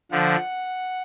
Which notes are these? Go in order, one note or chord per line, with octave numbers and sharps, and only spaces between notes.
D3 F3 F#5